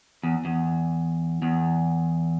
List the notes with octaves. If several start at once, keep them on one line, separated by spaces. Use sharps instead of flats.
E2
E2
E2